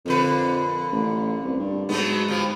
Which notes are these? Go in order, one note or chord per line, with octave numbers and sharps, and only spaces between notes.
F2 A#2 D3 B4
A1
C2
G2
G#2 F#3 A3 B3
G2 F3